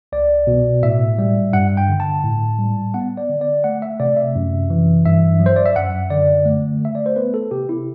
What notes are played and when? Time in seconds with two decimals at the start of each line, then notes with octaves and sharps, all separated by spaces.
0.12 C2 D5
0.47 B2
0.83 A2 E5
1.18 G3
1.53 G2 F#5
1.77 G5
1.88 D3
2.00 A5
2.24 A2
2.58 G3
2.94 B3 F#5
3.17 D5
3.30 D3
3.41 D5
3.64 A3 F#5
3.82 E5
4.00 C3 D5
4.17 E5
4.35 F#2
4.70 E3
5.05 G2 E5
5.40 F#3
5.46 C5
5.56 D5
5.65 E5
5.76 F#2 F#5
6.10 D3 D5
6.45 A3
6.81 A3 E5
6.95 D5
7.06 C5
7.16 B3 B4
7.34 A4
7.51 C3 G4
7.69 E4